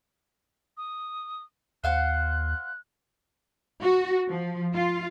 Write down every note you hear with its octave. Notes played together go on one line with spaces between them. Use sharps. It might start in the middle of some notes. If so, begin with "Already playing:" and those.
D#6
D#2 C5 F5 F#5 F#6
F#4
F3
F4